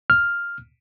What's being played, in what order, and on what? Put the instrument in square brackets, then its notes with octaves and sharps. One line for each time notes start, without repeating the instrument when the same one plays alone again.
[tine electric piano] F6